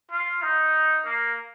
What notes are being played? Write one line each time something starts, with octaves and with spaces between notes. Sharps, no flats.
F4
D#4
A#3